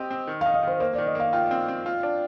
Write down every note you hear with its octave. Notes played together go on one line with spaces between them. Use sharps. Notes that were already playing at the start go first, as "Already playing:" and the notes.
Already playing: C4 G4 D#5
C4
D#3
F5
D#4
D#5
D#3 C5
A#3 C5
D5
D#3
D#5
A#3 F5
F4 G5
C4
C4
F4
D4